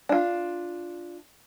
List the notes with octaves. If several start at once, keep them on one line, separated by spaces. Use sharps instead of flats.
D4 F4